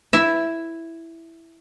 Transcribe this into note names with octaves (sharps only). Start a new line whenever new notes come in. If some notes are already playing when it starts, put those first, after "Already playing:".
E4 E5